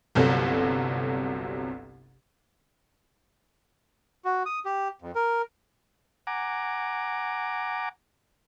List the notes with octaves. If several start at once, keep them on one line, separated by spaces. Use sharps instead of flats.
G1 C2 C3 F#3 A4
F#4
D#6
G4
F2
A#4
F#5 G#5 A#5 D6